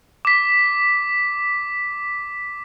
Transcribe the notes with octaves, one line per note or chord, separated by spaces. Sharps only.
D6 B6